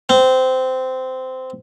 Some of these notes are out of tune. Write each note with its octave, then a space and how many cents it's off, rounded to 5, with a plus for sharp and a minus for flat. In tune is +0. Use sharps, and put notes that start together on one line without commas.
C4 -15